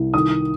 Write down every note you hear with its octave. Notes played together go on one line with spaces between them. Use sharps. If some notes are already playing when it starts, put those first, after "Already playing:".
Already playing: C2
D#3 D#6